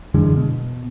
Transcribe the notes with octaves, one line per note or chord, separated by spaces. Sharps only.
F#2 D3 E3 G#3
B2